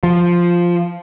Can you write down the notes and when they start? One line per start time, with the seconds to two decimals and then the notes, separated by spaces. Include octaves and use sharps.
0.03 F3